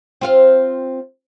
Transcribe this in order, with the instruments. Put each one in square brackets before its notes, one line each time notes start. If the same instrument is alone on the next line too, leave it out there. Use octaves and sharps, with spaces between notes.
[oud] C4 F4 F5